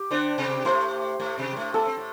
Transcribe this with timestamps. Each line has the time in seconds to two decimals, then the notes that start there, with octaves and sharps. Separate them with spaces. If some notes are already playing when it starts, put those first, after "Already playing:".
Already playing: G4
0.11 D3 D4 C5
0.38 C3 C4
0.65 A2 A3 C5
1.20 A2 A3
1.38 C3 C4
1.52 G3
1.56 A2 A3
1.74 A3 A4
1.87 C4
1.97 A2